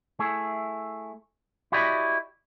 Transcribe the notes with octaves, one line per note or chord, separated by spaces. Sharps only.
A3 E4 G#4
E4 F#4 G4 D5 D#5